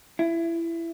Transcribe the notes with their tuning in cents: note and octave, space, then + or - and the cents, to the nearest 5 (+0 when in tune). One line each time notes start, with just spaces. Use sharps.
E4 +20